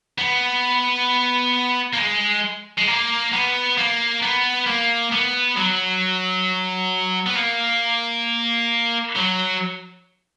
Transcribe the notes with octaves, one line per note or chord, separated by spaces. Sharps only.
B3
A#3
G#3
G#3
A#3
B3
A#3
B3
A#3
B3
F#3
B3
A#3
F#3